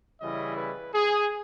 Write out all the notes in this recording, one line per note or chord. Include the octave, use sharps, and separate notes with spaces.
C#3 E3 G3 C#4 E4 D#5
B4
G#4